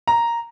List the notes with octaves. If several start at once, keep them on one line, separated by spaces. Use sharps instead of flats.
A#5